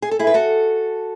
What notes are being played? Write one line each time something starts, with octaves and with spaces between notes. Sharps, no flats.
G#4
A4
E4 G#4
B4
F#4 A4